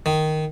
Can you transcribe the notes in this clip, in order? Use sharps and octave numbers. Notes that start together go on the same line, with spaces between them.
D#3